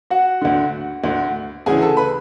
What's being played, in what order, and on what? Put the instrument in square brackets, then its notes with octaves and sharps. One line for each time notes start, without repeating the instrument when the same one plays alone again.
[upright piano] F#4 F#5
D2 D3
D2 D3
D2 C#3 E3 G#4 G#5
A4 A5
B4 B5